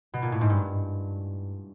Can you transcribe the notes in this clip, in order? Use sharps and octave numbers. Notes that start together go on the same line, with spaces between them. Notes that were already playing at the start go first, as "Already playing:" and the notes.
B2
A#2
A2
G#2
G2